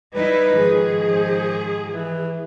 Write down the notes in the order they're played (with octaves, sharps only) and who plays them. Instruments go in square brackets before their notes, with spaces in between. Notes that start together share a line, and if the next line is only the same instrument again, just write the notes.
[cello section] G3 D#4 E4 [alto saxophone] B4
[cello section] G#2 D#3 F3 [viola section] G#4
[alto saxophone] C5
E3